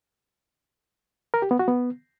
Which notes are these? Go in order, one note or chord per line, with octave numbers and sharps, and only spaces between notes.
A#4
G4
B3
F#4
B3